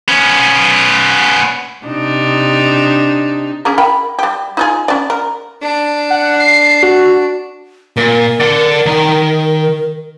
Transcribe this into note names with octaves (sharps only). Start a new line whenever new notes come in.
B3 C#4
C3 D4 D#4
C#4 G#4 A#4
A#4 G5 B5
G3 G4
D#4 F4 G#4
C#4 D5
A#4
D4
F#5
C7
F#4
A#2 A#4
D5 F#5
D#3 A#5